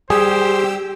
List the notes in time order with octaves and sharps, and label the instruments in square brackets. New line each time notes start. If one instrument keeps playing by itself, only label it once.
[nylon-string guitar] G3 [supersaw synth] G4 E6 [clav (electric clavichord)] G#4 [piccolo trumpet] C5